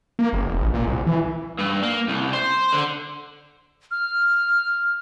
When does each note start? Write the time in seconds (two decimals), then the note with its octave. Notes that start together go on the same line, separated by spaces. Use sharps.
0.19 A#3
0.33 F#1
0.47 E1
0.60 A1
0.74 A#2
0.87 C2
1.07 E3
1.59 G2
1.83 A#3
2.08 C2
2.33 C5
2.73 D3
3.91 F6